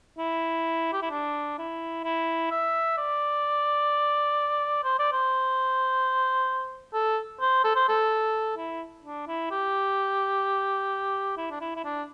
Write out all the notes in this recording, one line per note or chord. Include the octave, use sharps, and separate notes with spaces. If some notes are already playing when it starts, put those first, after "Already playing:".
E4
G4
E4
D4
E4
E4
E5
D5
C5
D5
C5
A4
C5
A4
C5
A4
E4
D4
E4
G4
E4
D4
E4
E4
D4